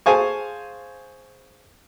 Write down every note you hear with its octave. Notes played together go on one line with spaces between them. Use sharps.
G#4 C5 F5 G#5 A5 C#6